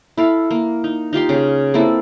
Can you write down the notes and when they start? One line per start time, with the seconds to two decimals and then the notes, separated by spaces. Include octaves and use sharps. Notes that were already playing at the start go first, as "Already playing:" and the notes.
0.17 E4 A4 F5
0.51 A#3
0.84 D#4
1.13 D#4 F4 G4 C6
1.29 C#3 G#4
1.74 A#3 C4 E4 A4